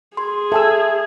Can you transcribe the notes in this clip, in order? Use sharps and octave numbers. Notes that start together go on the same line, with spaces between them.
G#4 C6
A4 E5 G#5 E6